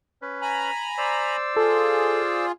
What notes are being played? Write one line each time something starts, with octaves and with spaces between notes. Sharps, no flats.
C#4 B4
G#5 A#5 B5
C5 D5 E6
F4 G#4 A4